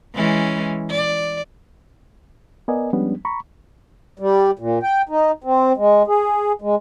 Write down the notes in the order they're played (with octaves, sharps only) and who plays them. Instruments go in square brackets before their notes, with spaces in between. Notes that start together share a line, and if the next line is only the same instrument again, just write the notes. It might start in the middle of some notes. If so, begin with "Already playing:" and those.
[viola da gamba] E3 G#3 C#4
D5
[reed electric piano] B3 A#4 D5 D#5 G#5
F3 G3 G#3 B3 C#4 D4
A#5 B5 C#6
[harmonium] G3
A#2
G5
D#4
C4
G#3
G#4
G#3